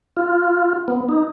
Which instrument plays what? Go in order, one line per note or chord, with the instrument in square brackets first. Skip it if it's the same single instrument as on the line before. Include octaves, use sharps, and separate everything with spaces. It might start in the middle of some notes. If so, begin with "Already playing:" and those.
[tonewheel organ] F4
B3
D#4